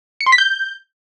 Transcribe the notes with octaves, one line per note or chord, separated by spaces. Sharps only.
C#7
C6
B6
G6